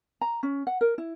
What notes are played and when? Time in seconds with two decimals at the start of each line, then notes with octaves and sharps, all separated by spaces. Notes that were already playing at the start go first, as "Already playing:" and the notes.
0.21 A#5
0.43 C#4
0.67 F#5
0.81 A#4
0.98 E4